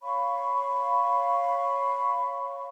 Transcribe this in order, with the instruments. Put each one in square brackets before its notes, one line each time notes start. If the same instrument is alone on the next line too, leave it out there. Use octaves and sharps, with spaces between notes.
[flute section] C#5 F5 B5 C#6